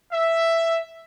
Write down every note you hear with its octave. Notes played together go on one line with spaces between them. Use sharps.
E5